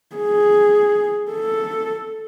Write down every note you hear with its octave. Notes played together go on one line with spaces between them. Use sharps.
G#4
A4